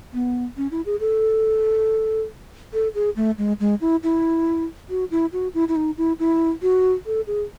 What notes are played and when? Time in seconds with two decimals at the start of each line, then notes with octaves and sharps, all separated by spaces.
0.13 B3
0.57 C#4
0.71 E4
0.86 G#4
1.00 A4
2.73 A4
2.95 G#4
3.16 A3
3.38 G#3
3.60 G#3
3.81 E4
4.03 E4
4.89 F#4
5.11 E4
5.33 F#4
5.54 E4
5.69 E4
5.76 D#4
5.98 E4
6.19 E4
6.62 F#4
7.06 A4
7.27 G#4